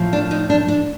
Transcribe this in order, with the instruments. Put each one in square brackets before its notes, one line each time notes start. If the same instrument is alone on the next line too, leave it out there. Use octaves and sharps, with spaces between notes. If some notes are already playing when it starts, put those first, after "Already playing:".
Already playing: [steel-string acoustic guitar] A2 F3
D4
D#4
D4
D4